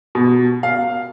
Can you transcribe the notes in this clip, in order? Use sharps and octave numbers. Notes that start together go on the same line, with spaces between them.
B2
F5